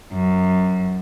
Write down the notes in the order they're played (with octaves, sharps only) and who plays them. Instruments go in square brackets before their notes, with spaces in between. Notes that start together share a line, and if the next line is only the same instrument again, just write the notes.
[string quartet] F#2